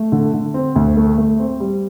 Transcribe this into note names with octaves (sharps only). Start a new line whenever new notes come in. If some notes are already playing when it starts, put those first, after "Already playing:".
Already playing: A3
D3
D3
C4
D2
A3
A3
C4
G3